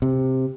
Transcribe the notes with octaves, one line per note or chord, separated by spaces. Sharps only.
C3